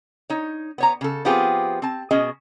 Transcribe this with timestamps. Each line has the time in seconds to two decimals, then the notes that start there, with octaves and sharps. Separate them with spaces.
0.30 D#4 C#5
0.78 B3 C#5 A#5
1.01 C#3 A4
1.25 F3 B3 C4 F4 G4 G#4
1.82 C4 A5
2.11 B2 C#4 G#4 D#5